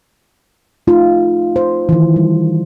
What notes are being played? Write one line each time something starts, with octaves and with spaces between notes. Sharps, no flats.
A3 D#4 F4
C5
D#3 E3
G3